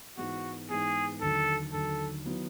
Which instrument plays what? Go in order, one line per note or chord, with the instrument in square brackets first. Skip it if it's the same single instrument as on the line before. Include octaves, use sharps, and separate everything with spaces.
[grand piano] G#2 E3 G#3 B3 [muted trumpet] F#4
[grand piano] G#2 E3 G#3 B3 [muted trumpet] G#4
[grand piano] D#2 D3 F#3 [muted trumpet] A4
[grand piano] D#2 D3 F#3 [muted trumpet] A4
[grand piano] D#3 F#3 B3 E4